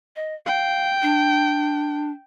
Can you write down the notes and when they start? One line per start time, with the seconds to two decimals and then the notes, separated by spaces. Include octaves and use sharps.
0.16 D#5
0.46 F5 G5
1.02 D4